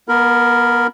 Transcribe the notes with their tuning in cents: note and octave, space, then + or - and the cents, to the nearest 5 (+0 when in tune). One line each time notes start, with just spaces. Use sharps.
B3 -35 A#4 +0 B5 +0